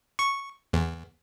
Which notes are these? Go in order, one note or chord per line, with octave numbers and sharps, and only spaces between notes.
C#6
E2